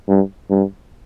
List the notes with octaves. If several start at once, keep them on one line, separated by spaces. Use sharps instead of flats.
G2
G2